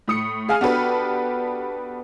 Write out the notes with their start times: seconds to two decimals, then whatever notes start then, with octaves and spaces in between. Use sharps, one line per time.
0.08 A2 D#6 C#7
0.49 G#4 F5 G#5 F6
0.61 B3 D4 F#4 G4 A4 B4